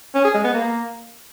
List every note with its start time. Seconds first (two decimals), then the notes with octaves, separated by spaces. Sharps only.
0.15 C#4
0.25 G#4
0.34 G#3
0.44 B3
0.54 A#3